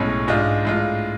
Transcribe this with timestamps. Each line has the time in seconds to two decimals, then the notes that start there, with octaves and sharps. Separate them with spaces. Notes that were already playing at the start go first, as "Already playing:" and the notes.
Already playing: B1 A2 G#3 C#4 C#6
0.27 G#2 G#3 D4 F4
0.65 A2 G#3 D4 F4